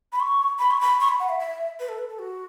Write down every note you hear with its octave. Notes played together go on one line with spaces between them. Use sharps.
B5
C#6
B5
C#6
B5
C#6
B5
F#5
E5
E5
B4
A4
B4
A4
F#4